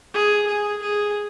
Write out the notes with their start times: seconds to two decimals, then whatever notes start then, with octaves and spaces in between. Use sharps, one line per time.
0.14 G#4
0.47 G#4
0.82 G#4